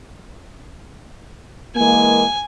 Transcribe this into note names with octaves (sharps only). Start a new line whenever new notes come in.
E3 G#3 A#3 G#5